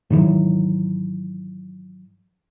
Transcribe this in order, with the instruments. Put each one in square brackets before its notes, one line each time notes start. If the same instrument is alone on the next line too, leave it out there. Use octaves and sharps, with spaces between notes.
[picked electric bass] G#2 D#3 E3 F#3